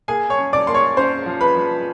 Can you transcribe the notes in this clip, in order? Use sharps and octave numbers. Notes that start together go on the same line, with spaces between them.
A#3 G#4 G#5
C#5 C#6
C#4
D5 D6
A#3 C6
C#5 C#6
C#4 C5 C6
F3
B4 B5
F3